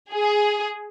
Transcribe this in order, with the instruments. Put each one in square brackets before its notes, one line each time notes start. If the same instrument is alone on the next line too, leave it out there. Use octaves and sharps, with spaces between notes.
[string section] G#4